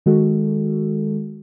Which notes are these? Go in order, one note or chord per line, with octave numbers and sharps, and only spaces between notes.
D#3 G#3 F#4 A4